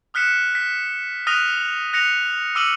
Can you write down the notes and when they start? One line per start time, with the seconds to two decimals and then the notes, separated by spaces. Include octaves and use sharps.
0.14 D#6 F6 F#6 B6 C#7 E7
0.55 B6
1.27 D#6 F6 F#6 A#6 D#7 F7
1.93 F#6 A#6 C#7 F7
2.55 D6 E6 F6 C#7 D#7 F#7